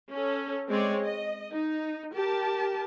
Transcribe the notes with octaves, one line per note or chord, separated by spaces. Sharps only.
C#4 A4
G#3 C4 C#5 D5
D#5
D#4
G4 A#4 A5